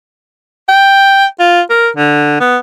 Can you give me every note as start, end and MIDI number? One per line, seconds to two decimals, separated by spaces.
0.69 1.26 79
1.40 1.61 65
1.70 1.89 70
1.97 2.37 50
2.40 2.57 59